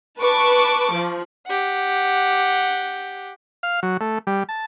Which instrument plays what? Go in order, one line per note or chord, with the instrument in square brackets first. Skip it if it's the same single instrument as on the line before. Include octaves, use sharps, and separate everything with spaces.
[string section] B4 A5 C#6 D6
F3
[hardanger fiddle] G4 F#5
[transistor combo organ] F5
F#3
A3
G3
A5